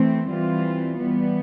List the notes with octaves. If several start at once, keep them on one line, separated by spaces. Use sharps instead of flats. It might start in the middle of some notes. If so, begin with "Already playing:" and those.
Already playing: E3 A3 C4
E3 G3 C4 F4
E3 G3 B3